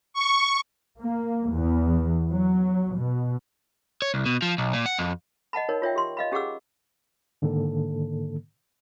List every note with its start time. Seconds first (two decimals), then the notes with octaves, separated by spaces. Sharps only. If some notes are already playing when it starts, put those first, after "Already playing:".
0.14 C#6
1.00 A#3
1.52 E2
2.32 F#3
2.96 B2
4.02 C#5
4.14 C2
4.26 B2
4.42 F3
4.58 B1
4.73 A#2
4.86 F#5
4.98 F2
5.53 D#5 F#5 A5 B5
5.69 D#4 A#4 C#5
5.82 F4 C#5 E5 G5
5.96 G4 C6
6.17 D#5 F5 B5
6.32 C#4 G4 G#4 F#5 D6 E6
7.42 G#2 D3 D#3 A#3 A4